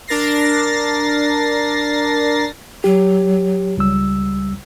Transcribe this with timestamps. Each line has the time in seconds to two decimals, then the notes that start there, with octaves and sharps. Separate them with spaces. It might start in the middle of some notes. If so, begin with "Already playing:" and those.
0.08 D4 A#4 A6 A#6 C7
2.84 F#3 G4
3.77 C#2 G3 E6